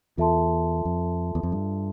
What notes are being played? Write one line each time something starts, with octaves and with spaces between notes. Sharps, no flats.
E2 F4 A4 E5 A5 C6
F2
E2
F2
G2